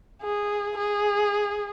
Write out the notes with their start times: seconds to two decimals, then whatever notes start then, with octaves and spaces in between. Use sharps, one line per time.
0.22 G#4
0.77 G#4